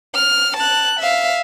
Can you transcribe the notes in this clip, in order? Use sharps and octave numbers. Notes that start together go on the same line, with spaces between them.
F6
A5 F#6
E5 F5